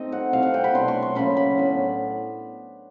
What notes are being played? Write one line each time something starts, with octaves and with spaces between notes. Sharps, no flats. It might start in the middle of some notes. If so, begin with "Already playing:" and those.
Already playing: A3 C4 D#4 D#5
F#5
C3 E3 A3 F5
F#5
G5
B5
B2 F#3 A3 D4 C6
C#6
C6
C#3 F#3 A#3 C#4 B5
B5
A2 F#3 B3 D4